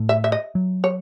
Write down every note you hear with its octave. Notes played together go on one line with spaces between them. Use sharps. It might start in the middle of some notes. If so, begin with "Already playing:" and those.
Already playing: A2
E5
E5
D#5
F#3
C#5